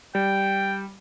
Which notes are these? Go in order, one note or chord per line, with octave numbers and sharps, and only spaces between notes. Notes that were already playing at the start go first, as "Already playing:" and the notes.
G3 G5